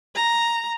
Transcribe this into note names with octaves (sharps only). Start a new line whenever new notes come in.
A#5